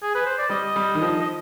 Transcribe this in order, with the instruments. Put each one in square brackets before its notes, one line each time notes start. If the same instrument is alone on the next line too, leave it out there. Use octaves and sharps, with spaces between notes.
[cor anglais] G#4
B4
C5
D5
[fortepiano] G3 [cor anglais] D#5
[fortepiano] G3
D#3
F3
[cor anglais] D#5